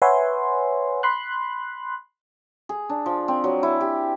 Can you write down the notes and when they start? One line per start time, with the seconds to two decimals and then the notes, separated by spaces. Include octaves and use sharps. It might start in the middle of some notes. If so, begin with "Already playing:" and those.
0.02 B4 C#5 E5 F#5 G#5 C6
1.03 B5 C6 F#6
2.69 G#4
2.89 D4
3.06 F3
3.28 C4
3.44 F#3
3.63 E4
3.81 G4